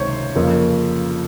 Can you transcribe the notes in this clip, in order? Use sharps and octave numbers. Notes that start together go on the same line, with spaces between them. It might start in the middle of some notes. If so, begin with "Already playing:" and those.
Already playing: C#2 C3 D#3 C5 C#5
F2 C#3 F3 A#3